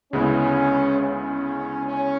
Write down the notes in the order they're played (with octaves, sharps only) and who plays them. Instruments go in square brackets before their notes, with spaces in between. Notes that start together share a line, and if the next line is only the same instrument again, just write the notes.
[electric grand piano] D2 C#3 G#3 B3 E4 [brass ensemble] C#4
[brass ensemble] C#4
C#4